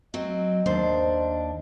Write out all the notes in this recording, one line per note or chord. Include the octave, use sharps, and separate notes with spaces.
F#3 C4 D#5
D#2 D4 C5